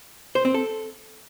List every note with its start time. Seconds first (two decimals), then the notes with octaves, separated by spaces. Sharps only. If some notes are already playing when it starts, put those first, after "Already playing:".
0.35 C5
0.45 C4
0.54 A4